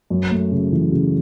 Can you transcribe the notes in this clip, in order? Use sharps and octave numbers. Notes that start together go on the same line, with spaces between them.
F#2
A3
C#3
E3
C#3